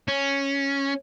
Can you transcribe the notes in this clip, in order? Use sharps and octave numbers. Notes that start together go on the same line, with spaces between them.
C#4